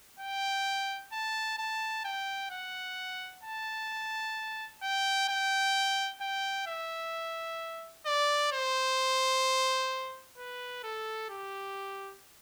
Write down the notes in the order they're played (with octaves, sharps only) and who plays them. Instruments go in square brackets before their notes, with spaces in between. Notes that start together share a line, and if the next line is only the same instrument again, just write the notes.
[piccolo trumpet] G5
A5
A5
G5
F#5
A5
G5
G5
G5
E5
D5
C5
B4
A4
G4